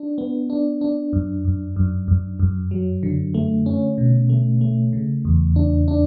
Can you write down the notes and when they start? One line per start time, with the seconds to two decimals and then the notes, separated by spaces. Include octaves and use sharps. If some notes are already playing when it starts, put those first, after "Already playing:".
Already playing: D4
0.18 B3
0.50 D4
0.81 D4
1.13 F#2
1.45 F#2
1.76 F#2
2.08 F#2
2.39 F#2
2.71 F#3
3.03 D3
3.34 A3
3.66 C#4
3.98 B2
4.29 A3
4.61 A3
4.93 C#3
5.25 E2
5.56 D4
5.88 D4